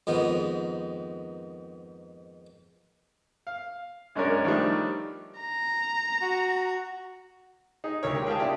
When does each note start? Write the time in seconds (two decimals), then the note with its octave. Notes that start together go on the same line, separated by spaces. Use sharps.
0.07 F2 G#2 D#3 B3
3.47 F5
4.15 F#2 G#3 C#4 D4 A#4 C#5
4.44 D#3 F3 G3 A3 D4
5.40 A#5
6.22 F#4
7.84 D#4 G#4
8.03 D2 A#4 C#5
8.15 G#3 A#3 G4
8.27 G#4 A#4 F5 G5 A5
8.39 C3 D4 E4 G4 D#6